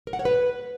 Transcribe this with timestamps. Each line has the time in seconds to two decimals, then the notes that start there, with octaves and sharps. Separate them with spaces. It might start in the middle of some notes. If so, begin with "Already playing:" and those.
0.07 A#4
0.13 F#5
0.19 C#5
0.25 B4